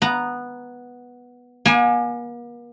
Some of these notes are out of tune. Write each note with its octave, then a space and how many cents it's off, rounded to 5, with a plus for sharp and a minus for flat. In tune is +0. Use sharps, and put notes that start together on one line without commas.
B3 -5 A#5 +0
A#3 +45 G#5 +0